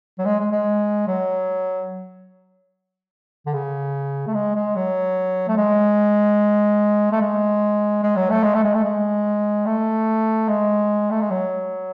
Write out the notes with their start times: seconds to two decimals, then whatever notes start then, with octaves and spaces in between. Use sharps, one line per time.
0.18 F#3
0.25 G#3
0.39 G#3
0.52 G#3
1.07 F#3
3.46 D3
3.53 C#3
4.27 A3
4.34 G#3
4.55 G#3
4.76 F#3
5.48 A3
5.57 G#3
7.12 A3
7.21 G#3
8.03 G#3
8.16 F#3
8.30 A3
8.43 G#3
8.54 A3
8.64 G#3
8.75 A3
8.84 G#3
9.66 A3
10.48 G#3
11.11 A3
11.21 G#3
11.30 F#3